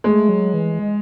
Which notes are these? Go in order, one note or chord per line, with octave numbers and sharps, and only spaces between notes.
G#3 A3
F#3
E3
G#3